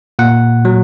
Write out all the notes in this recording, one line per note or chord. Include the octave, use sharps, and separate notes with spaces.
A#2 F#5
F#3